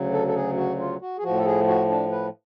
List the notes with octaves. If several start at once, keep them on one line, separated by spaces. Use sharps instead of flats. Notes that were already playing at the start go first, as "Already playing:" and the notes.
Already playing: D2 C#3 F#3
A4
A4
G#4
F#4
F4
F#4
G#4
A2 F3 F#4
A4
G#4
F#4
D4
B4